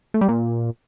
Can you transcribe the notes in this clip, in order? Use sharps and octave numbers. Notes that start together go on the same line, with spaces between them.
A3
G3
A#2